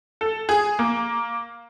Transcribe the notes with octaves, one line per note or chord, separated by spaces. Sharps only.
A4
G#4
A#3